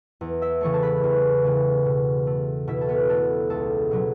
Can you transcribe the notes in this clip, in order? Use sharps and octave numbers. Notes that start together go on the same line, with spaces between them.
E2
E5 E6
C#3 E3 A3 C#5 C#6
A5
B4 B5
E2
C#3 E3 A3
B2
A3
B2 E4 E5
A4
B3 B4
A3 A4
C#2 A4
B2 F#3 B3